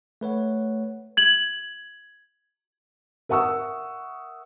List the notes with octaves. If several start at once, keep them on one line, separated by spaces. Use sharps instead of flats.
A3 B4 C#5 F#5
G#6 F#7
A#4 E5 F#5 C#6 D#6 E6